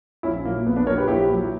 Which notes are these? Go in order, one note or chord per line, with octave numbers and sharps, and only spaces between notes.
A#1 C#4 E4
A#2 F#3 A#3
A#1 B3
B3 D4
A#2 F#3 A#4 C#5
G4 B4
A#1 E4 G4
A#2 F#3